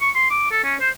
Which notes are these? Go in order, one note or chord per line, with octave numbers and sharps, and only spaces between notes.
C#6
C6
D6
A4
C#4
C5